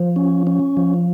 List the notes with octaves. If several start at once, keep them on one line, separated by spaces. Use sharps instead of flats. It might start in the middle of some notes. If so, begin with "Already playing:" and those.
Already playing: F3
C#4
C#4
F3